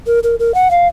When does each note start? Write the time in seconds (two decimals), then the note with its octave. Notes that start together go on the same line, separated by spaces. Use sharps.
0.07 A#4
0.23 A#4
0.39 A#4
0.55 F#5
0.71 F5